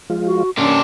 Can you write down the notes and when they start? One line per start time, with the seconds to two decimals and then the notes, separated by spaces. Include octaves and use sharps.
0.10 F3 G#3 F4
0.26 F#4
0.58 C3 A#3 C#4 D4